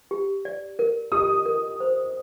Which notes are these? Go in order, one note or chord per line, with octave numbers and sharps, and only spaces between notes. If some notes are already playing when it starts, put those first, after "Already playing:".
G4
D5
A#4
G4 D#6
A#4
C5